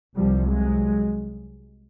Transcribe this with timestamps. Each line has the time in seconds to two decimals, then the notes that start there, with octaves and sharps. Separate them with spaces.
0.16 C2 C3 F3 G3
0.49 F#3 G#3